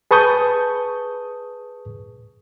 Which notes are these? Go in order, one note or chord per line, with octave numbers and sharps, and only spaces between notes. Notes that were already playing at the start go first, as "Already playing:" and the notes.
G#4 B4 A5 C#6 D#6 G6